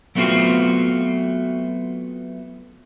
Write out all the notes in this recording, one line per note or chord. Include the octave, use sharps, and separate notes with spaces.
F#3 A3 B3 C4 F4 F#4